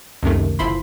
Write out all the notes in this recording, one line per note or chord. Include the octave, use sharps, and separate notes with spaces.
C#2 F#2 C3 D#3 A3
G1 F3 E4 B5 C6